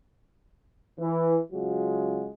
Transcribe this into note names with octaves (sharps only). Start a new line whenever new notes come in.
E3
C#3 F#3 G#3 F4 F#4